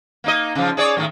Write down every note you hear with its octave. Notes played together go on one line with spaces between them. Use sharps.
A#3 D#4 D#5
C#3 F3
G#4 C#5 D5
A2 D#3 F#3